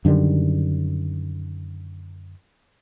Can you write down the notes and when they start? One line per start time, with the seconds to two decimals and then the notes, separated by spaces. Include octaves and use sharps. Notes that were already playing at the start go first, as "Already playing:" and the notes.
0.05 F#2 D3 D#3 G3